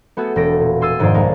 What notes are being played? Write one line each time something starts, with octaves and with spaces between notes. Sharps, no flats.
A3 B3 F#4 G#4 A4
E1 A4 A#6 D7
A#2
G#5 C6 E6 A6 D#7
F1 G#2 D#3 G#4 C5 D5
B1 G#3 A#4 A5